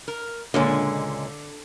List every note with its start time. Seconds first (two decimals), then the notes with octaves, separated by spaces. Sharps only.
0.08 A#4
0.54 C#2 A#2 D3 G#3